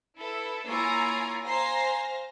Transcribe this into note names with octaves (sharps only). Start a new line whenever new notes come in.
E4 A4 B4
A#3 E4 F4 C#5 G#5 A#5
C5 F5 G#5 A#5 C6 A#6